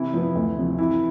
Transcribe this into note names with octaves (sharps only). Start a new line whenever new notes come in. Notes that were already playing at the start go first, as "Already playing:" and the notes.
Already playing: C3 E3 E4
F3 B3
D2
C3 F3
C3 E3 E4